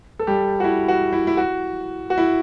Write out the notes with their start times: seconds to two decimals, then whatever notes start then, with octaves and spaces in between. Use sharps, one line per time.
0.19 A4
0.27 G3 G4
0.60 F#4
0.64 E4
0.88 F#4
1.13 E4
1.27 E4
1.37 F#4
2.10 F#4
2.18 E4